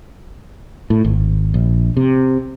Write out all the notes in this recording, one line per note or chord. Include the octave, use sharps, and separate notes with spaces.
A2
G#1
A#1
C3